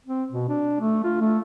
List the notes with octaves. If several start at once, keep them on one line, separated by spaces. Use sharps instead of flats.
C4
B2
D4
A3
F4
A3